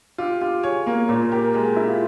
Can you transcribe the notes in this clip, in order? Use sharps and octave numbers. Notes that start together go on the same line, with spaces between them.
F4 G4
F4 G4
G#4 C#5
A#3 C5
A#2 C#5
A#4 C5
G4 A#4
A#4
G#3 G#4
G4
E4
F4